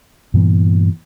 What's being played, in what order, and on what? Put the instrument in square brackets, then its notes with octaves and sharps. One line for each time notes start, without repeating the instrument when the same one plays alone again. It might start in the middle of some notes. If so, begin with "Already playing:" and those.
[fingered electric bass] G2 A#2 E3 B3